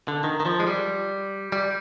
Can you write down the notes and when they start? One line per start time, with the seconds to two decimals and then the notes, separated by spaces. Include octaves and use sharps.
0.08 D3
0.24 D#3
0.40 D#3
0.46 F3
0.60 G#3
0.67 G3
1.52 G3